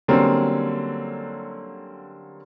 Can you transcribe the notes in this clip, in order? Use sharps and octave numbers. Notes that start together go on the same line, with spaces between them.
D3 F#3 G3 A#3 C4 C#4